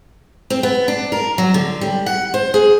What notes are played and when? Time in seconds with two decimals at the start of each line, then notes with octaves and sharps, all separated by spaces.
0.50 C4
0.63 B3
0.88 D4
1.12 A#4
1.38 F#3
1.54 D3
1.81 G3
2.06 F#5
2.34 C5
2.54 G#4